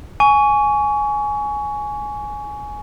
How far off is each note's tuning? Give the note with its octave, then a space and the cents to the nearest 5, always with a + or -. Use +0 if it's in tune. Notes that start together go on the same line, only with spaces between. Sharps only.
G#5 +10 C#6 +25